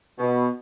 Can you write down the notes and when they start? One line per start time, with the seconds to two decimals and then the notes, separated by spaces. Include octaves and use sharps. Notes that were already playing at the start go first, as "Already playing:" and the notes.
0.19 B2